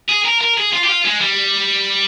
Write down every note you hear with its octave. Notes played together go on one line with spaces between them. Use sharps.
G#4
A#4
A#4
G#4
F4
G4
F4
G#3
G3